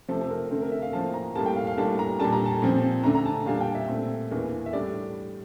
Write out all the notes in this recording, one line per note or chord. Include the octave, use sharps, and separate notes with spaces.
C3 F3 A3 C4 A4
A4
A#4
D3 A3 C4 A#4
A#4
E5
F5
A2 F3 A#3 A5
A#5
A2 G3 A#3 A5
G5
F5
F5
A2 G3 A#3 D4 A5
A#5
A#2 G3 D4 A5
A#5
A5
A#2 F3 C4
D3 A3 D4 A#5
A#5
A5
A#2 G3 D4 F5
A5
G5
E5
A#2 A3 C4
E2 E3 A#3 D4
E5
A2 G3 D4 D5